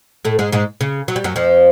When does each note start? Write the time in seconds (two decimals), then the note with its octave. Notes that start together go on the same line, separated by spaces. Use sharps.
0.25 A2 A3
0.39 G#2 G#3
0.52 G#2 G#3
0.81 C#3
1.08 F#3
1.16 G3
1.24 F#2 F#3
1.36 F2 F3